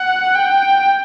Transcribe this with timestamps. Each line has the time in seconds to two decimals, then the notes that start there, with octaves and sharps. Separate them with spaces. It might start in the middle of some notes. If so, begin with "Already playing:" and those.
Already playing: F#5
0.35 G5